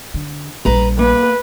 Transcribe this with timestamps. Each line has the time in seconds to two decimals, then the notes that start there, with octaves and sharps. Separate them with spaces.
0.14 D3
0.65 A#1 G3 B4 A#5
0.99 A#3 B4